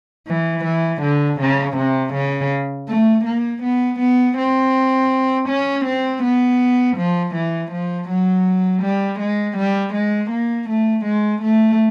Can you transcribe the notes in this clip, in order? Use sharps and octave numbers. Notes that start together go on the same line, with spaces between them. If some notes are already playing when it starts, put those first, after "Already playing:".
E3
E3
D3
C#3
C3
C#3
A3
A#3
B3
B3
C4
C#4
C4
B3
F3
E3
F3
F#3
G3
G#3
G3
G#3
A#3
A3
G#3
A3